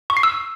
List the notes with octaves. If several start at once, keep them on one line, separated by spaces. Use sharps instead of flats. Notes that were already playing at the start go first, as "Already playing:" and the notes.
C#6
C7
E6